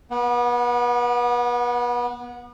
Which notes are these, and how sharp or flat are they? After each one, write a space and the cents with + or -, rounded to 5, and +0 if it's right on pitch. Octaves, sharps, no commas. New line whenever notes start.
B3 -30 F#5 +0